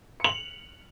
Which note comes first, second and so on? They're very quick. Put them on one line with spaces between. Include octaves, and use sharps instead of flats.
C#7 F#7 F7